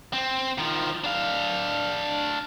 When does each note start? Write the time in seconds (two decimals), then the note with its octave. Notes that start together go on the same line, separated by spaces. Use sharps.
0.13 C4
0.58 D#3 F3
1.04 D4 F5